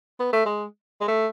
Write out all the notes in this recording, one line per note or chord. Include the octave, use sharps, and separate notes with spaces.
B3
A3
G#3
G#3
A3